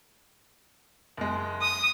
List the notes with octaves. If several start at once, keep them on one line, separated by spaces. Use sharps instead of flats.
F#1 G#3
D#6